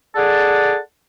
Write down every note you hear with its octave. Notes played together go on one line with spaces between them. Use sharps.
G#4 A4 D5 F#5 A5